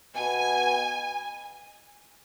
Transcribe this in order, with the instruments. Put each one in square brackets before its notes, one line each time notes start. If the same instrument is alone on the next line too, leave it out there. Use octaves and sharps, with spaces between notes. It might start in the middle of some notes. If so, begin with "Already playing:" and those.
[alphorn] B2 [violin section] G#5